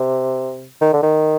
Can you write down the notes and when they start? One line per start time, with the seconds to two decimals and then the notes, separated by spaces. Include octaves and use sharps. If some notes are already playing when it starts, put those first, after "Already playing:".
Already playing: C3
0.81 D#3
0.93 D3
1.03 D#3